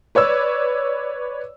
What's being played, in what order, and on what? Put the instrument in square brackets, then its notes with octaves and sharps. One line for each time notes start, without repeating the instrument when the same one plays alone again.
[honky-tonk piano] B4 C#5 D5 E6